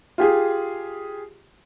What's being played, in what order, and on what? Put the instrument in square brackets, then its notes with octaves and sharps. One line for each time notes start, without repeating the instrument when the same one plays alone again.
[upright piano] F4 G4 G#4